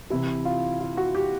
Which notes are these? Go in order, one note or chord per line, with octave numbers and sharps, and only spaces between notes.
C3 E3 E4
F4
F4
F#4
G4